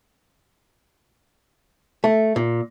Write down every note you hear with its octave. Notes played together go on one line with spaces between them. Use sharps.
A3
A#2